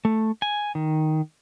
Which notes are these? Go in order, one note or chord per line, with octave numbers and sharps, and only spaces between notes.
A3
G#5
D#3